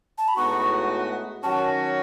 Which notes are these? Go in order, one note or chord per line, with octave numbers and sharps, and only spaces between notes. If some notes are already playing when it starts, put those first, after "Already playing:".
A5
B5
A2 G#3 B3 D#4 F#4 C#6
D#3 F#3 C#4 F#4 A5